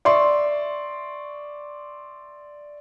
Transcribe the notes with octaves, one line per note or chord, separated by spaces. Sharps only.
D5 E5 C6 C#6